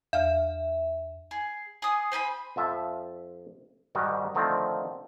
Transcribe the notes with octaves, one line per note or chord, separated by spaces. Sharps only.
E2 E5 F5 F6
G#4
G#4 D#6
C5 G#5 A5 B5
F2 F3 E5 A5
G#2 D#3 G3 F#4
D3 D#3 F3 A3 C4